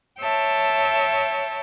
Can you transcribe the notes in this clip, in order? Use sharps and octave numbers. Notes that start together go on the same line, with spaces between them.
C#5 E5 G5 A5